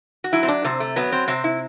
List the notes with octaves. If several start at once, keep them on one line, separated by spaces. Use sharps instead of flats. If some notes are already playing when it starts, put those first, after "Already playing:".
F#4
F#3 E4
C4
D4
C3 C4
A3
F#3 B3
C4
C3 C4
E4